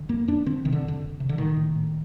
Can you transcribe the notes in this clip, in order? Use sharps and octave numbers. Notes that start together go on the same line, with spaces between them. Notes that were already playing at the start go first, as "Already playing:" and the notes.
Already playing: D3
F2 A#3
F2 D4
D3 C4
C3 D#3
D3
F2 D3
F2
C3
D3
A2 D#3
A2
A2